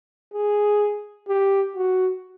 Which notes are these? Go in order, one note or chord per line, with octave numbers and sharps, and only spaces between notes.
G#4
G4
F#4